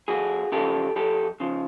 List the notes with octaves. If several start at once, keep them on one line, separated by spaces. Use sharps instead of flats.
F2 F#4 G#4
C#3 F3 G4 A4
F2 G4 A4
C#3 F3